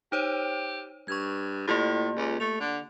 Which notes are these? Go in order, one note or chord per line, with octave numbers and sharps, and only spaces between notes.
D#4 G4 C5 C#5
G2 C#6 G#6
A2 A#3 F4 G4
C#2
A3 F7
D3